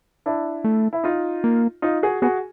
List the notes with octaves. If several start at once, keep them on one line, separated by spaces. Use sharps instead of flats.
D4 E4
A3
E4
D#4 F4
A#3
D#4 F4
F#4 G#4
B3 F#4 G#4